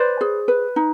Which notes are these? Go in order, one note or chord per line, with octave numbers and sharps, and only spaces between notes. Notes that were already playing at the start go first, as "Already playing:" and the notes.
Already playing: B4 C5 D5
G#4
B4
D#4